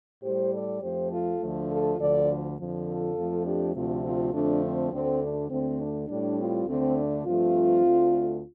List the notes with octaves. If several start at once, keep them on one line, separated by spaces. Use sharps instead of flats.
A2 G3 G4 C5
A4 D5
F2 F3 A3 G4 C5
F4 A4
D2 D3 F3 A3
F4 A4
D2 D3 F3 A4 D5
F2 D3 F3
F4 A4
F2 F3 A3
D4 G4
D2 C3 F3 A3 C4 F4
C4 F4
F2 D3 F3 A3 D4
C4
D2 D3 A3 C4
D4
D2 D3 A3 C4
D4
A2 G3 D4
C4 F4
D2 D3 A3 C4
D4
G2 F3 A3 C4 F4
D2 D3 A3